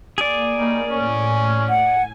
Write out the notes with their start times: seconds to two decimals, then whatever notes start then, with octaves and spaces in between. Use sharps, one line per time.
0.18 A#3 G#4 D5
0.58 G3 C#4 D#4
0.88 A2 C#4
1.69 F#5 G#5